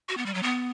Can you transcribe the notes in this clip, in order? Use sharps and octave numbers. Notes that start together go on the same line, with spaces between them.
F#4
B3
G3
F#3
B3